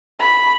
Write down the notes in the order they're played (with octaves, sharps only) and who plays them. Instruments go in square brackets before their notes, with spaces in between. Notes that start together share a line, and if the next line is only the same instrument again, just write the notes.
[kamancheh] B5